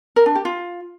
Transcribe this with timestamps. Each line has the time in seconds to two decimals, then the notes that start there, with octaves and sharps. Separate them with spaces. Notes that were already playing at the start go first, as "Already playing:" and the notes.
0.16 A#4
0.26 D4
0.35 G4
0.45 F4